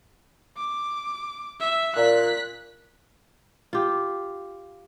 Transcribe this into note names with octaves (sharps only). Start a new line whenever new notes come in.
D6
E5
A#2 F#6 B6
F4 G4